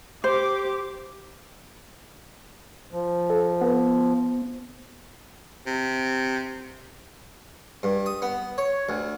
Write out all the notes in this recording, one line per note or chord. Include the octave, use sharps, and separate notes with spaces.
G4 C5 D6
F3
A4
B3
C3
G2
D#6
B3
C#5
D2